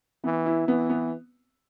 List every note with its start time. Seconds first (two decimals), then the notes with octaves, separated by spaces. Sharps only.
0.24 E3 B3
0.46 E4
0.68 E3 B3
0.89 B3